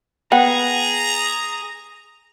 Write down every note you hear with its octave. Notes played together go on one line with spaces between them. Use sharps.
B3 G#4 G5 A#5